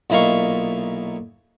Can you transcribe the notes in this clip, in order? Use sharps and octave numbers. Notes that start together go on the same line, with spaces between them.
B1 A#2 E4 D#5 F5 C#6